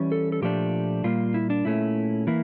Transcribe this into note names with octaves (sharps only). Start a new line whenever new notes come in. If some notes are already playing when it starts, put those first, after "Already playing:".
Already playing: E3 G3 C#4
A4
A4
A#2 F3 A3 D4 G4
A#2 G3 A#3 F4
E4
D4
A#2 A3 C#4 E4
E3 A#3 E4